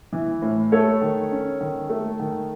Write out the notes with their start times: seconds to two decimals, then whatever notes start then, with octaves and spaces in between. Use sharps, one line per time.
0.13 E3
0.42 A2
0.72 A3 A4 C#5
1.02 D#3
1.31 C#4
1.61 D#3
1.89 A3
2.19 D#3